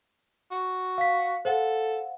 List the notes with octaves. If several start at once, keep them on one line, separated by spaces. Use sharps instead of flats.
F#4
F5 B6
A4 C5 F5 F#5